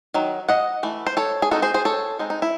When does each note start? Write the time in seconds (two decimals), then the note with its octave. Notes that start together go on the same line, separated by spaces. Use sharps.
0.14 D#3 F#3
0.49 D#5 F#5
0.83 E3 A3
1.07 C5
1.17 A4 C#5
1.42 G#4
1.51 G#3 C4 D#4 F#4 A4
1.62 G#4 C5
1.74 G#4 C5
1.85 A4 C#5
2.19 G#3 C4 D#4
2.30 D#4
2.42 E4